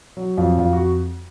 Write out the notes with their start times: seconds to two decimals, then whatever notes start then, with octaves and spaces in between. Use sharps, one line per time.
0.17 F#3
0.37 F2 F4
0.58 F2 F4
0.73 F#4